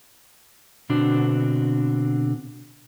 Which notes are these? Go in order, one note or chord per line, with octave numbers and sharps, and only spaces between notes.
B2 D3 C4 D4 F#4